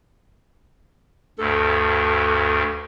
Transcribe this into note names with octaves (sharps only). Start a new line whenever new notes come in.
D2 G2 A4